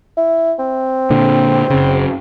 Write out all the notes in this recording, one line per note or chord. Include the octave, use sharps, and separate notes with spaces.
E4
C4
A#2 D3
F#1 C#3